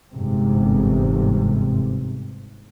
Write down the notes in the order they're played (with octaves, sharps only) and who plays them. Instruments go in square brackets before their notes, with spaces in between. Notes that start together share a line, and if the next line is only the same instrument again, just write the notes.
[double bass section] G1 E2 G#2 C3